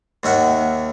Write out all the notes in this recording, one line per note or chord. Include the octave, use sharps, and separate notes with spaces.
D#2 D#3 E5 F#5